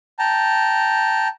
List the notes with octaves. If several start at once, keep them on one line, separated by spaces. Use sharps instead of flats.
G5 A5 A#5